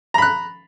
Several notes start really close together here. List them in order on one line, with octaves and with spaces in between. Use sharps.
A#5 B5 F#6